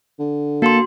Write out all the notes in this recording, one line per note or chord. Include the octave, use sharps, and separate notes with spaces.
D3
A#3 F#4 A4 C6